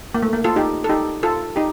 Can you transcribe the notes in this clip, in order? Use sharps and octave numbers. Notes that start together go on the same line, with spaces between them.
A#3
A3
A#3
F4 A4
D#4 G4
A4
D#4 G4
F4 A4
D#4 G4